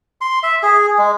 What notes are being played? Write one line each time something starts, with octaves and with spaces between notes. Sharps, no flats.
C6
E5
G#4
G#3